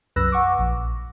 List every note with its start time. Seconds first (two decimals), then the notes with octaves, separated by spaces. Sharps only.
0.16 C2 F#2 B4 E6 F#6 A#6
0.32 F#5 C#6 D6
0.59 A#1